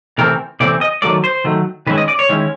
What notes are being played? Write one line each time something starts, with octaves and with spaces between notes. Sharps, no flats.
C3 E3 A3 C4 A#4
C3 E3 A3 C4 D5
D#5
D#3 F#3 A3 D5
C5
D#3 F#3 A3
D#3 G#3 C#4 E4 B4
D#5
D5
C#5
D#3 G#3 C#4 E4